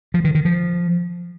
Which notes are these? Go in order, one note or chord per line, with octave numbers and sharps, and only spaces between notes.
F3
D#3
D#3
F3